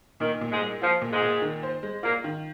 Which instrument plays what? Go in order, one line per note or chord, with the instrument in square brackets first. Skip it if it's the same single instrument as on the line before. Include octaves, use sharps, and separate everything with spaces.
[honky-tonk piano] A#2 [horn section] D#3
[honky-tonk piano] A#2
[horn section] G#2 G#3
[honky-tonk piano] G#3
[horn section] F3 [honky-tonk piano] F4
[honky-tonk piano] A#2
[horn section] G#2 G#3
[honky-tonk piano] A#2
D#3
C5
G#3
[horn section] A#2 A#3 [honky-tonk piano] F4
[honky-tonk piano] D#3